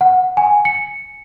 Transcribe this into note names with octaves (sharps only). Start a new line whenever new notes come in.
F#5
G#5
C#7